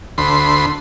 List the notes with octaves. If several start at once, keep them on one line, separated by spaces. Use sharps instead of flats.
D2 B5 C6